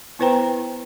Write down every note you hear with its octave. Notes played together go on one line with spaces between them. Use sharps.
B3 E4 B4 C5 G5 A#5